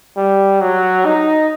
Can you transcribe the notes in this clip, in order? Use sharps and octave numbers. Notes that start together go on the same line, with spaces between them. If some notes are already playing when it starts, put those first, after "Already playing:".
G3
F#3
D#4